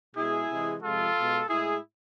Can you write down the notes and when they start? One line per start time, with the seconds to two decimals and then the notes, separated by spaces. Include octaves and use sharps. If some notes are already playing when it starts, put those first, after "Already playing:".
0.15 B2 G#3 E4 G#4
0.48 C3 E3 G#3
0.82 C3 F3 G#3 F4 A4
1.15 B2 G#3
1.48 A2 G#3 E4 G#4